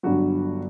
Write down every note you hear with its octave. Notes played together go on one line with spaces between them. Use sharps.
G1 G2 F#3 F#4